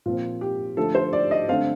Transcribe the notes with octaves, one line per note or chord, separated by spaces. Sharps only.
A#2 F3 C4 F4
G4
D3 F3 A3 A4
C5
D5
D#5
D3 A3 C4 F5